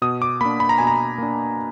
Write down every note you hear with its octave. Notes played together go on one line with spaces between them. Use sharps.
B2 D#6
D6
A#3 D4 B5
B5
A#5
B2 G#5
A#5
A#3 D4